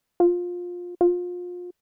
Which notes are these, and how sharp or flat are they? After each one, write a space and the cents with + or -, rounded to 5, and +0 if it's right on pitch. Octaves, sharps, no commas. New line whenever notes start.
F4 +20
F4 +30